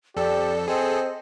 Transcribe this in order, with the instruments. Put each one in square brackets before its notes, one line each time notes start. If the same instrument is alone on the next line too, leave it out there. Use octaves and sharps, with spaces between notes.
[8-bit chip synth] F2 A4 [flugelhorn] G4 [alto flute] D5
[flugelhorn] C4 [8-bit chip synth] G#4 A4 [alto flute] D#5